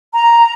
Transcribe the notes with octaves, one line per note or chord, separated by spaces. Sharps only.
A#5